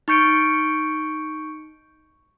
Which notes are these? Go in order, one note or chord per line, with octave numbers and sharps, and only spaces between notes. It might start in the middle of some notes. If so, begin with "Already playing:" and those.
D#4 C#6 G6 C#7 D7